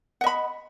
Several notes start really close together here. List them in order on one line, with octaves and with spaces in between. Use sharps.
F#5 D#5 B5